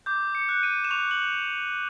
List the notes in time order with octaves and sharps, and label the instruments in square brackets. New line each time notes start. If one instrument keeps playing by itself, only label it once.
[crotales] D6 G6
C#7
F#6
D#7
E7
C#6 F7
F#7